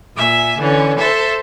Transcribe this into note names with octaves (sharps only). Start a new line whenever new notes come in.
A#2 E5 G#5
D3 E3 C#4
A4 C5 E5